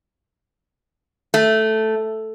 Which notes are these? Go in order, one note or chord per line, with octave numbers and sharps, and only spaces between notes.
A3